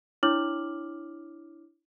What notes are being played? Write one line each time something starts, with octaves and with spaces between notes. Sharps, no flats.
D4 E4 C#5 D6 F6 F#7